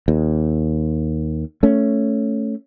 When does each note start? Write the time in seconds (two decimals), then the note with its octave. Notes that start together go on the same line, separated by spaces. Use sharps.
0.08 D#2
1.63 A3 C#4